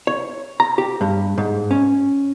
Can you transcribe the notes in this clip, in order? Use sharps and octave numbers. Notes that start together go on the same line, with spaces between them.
C#5
A#5
G4
G2
G#2
C#4